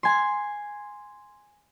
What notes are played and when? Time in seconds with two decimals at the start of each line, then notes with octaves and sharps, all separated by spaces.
0.03 G#5 C6